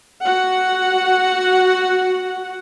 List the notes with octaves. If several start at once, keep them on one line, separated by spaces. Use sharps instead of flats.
F#4 F#5